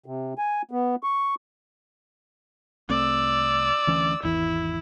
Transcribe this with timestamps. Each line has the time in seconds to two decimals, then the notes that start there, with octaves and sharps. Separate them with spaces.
0.06 C3
0.38 G#5
0.71 B3
1.03 C#6
2.90 C2 A3 C4 D5 E6
3.87 D2 E3 C#4
4.23 G#1 E2 E3 E4